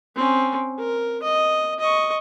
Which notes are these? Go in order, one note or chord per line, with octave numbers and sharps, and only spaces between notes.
C4 C#4
A#4
D#5
D#5 C#6